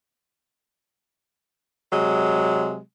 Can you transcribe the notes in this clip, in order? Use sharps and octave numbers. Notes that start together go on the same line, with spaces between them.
C3 F#3 G#3